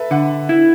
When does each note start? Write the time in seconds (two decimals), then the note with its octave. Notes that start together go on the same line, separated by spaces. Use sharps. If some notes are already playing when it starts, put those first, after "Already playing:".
Already playing: A4 B4 E5
0.11 D3 F#5
0.49 E4